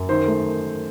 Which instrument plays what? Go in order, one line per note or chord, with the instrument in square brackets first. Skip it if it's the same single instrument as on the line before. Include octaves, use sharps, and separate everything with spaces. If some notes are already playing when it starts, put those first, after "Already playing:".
Already playing: [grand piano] F#2
D#3 C5
A3